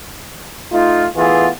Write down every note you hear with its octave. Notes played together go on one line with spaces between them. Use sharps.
A3 D#4 F4
E3 A3 B3 F4 G#4